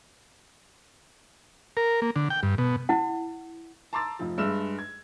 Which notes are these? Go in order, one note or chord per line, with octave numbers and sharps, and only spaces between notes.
A#4
A#3
D3
G5
G2
B2
E4 F#5
A5 A#5 C6 D6 E6 A6
F1 F3
G2 G#3 E5 E6 E7
G#6